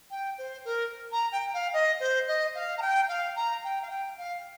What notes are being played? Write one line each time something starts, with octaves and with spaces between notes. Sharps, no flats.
G5
C5
A#4
A#5
G5
F5
D#5
C5
D#5
F5
A#5
G5
F5
A#5
G5
F5
G5
F5